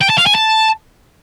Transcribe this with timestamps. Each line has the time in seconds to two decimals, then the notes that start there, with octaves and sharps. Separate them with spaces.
0.02 G5
0.10 A5
0.18 F5
0.27 G#5
0.35 A5